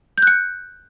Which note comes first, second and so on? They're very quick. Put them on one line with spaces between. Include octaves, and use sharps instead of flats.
G6 F#6 C#7